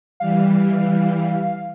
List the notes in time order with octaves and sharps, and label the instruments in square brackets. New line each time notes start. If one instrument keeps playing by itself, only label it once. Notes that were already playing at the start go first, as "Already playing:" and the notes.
[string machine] E3 G3 [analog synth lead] F5